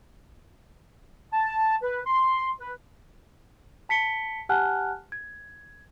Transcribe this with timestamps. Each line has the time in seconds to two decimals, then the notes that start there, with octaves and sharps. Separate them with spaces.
1.33 A5
1.82 B4
2.07 C6
2.61 B4
3.89 A5 B6 C#7 G7
4.49 G4 F#5 G#5 A5 F6 F#6
5.12 G#6